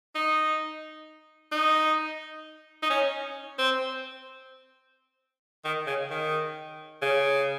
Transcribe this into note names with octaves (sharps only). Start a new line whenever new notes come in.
D#4
D#4
D#4
C#4
C4
D#3
C#3
D#3
C#3